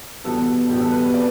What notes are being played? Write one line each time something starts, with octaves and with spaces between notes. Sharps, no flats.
E2 B2 G3 B3 A4
E2 B2 G3 B3 G4
A4
B4
B4
C3 D5